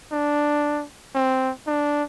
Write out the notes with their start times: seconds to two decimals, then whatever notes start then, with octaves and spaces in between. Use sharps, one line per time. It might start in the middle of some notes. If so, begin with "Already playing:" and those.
0.12 D4
1.15 C4
1.67 D4